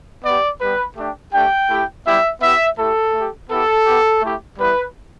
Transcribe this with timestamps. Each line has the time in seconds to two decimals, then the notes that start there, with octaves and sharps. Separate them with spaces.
0.24 B3 D5
0.29 G4
0.60 G3 B3 G4 B4
0.97 A3 D4 G4
1.33 A3 D4 G4 G5
1.69 A3 E4 G4
2.06 G3 B3 E4 G4 E5
2.41 B3 E4 G4 E5
2.78 A3 E4 G4 A4
3.14 A3 G4
3.50 B3 E4 G4 A4
3.86 B3 G4
4.22 A3 E4 G4
4.58 G3 B3 E4 B4